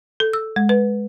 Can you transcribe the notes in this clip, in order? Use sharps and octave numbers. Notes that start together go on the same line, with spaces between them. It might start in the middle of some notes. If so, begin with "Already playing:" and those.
A4
E6
G#3
B4